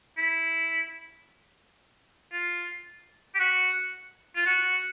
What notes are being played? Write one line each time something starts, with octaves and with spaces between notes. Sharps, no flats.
E4
F4
G4
F#4
F4
F#4